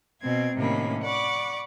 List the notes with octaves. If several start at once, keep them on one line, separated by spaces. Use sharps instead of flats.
B2 C4 G#6
A2 C3 D#3 A#3 C#4 B5
D5 F#5 B5 C#6 D6